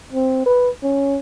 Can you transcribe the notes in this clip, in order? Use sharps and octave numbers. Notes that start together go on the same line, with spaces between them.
C4
B4
C#4